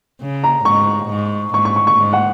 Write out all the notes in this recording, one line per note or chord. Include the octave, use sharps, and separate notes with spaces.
C#3
A#5
G#2 C#6
G#2
G#2 C#6
C#6
C#6
C#6
G#2
F#5